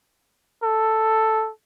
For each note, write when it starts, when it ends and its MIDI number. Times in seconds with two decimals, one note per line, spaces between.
0.63 1.50 69